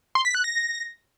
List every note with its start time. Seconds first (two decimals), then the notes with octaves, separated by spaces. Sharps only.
0.15 C6
0.25 B6
0.35 F#6
0.44 A#6